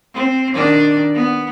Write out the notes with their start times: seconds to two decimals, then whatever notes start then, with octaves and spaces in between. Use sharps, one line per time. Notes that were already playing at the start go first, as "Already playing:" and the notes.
0.14 C4
0.53 D#3 D4 D5
1.15 B3